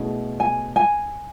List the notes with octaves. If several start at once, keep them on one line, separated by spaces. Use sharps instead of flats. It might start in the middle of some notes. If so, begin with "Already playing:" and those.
Already playing: B2 A3 C#4 E4 G#4
G#5
G#5